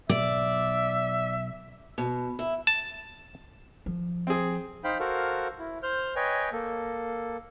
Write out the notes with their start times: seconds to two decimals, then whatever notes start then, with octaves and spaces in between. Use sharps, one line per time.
0.09 B1 D5 E5
1.98 B2
2.39 E4
2.67 A5
3.86 F3
4.27 C4 G#4
4.84 D#4 C5 F5 G5 B5
4.99 F#4 A4 A#4 C5 F5
5.59 E4
5.83 C5 F6 G6
6.16 B4 C#5 D#5 G5 G#5
6.52 A#3 A4